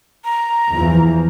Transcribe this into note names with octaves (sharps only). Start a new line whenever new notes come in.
A#5
E2 E3 F3